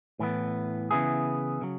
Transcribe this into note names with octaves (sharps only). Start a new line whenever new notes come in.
A2 E3 B3
C#3 E3 B3 E4 G#4
C#3 F#3